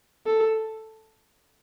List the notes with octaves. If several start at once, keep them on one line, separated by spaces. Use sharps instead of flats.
A4